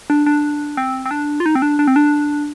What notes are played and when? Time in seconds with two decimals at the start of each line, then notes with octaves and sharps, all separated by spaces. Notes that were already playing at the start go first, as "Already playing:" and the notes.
0.10 D4
0.26 D4
0.77 C4
1.06 C4
1.11 D4
1.40 F4
1.46 D#4
1.55 C4
1.62 D4
1.79 D4
1.87 C4
1.96 D4